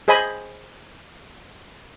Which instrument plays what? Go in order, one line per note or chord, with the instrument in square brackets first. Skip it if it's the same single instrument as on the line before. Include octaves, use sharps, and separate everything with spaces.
[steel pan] G#4 C5 D#5 G#5 B5